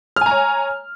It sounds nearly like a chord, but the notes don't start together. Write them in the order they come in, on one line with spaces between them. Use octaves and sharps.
F6 G#5 A#5 C#5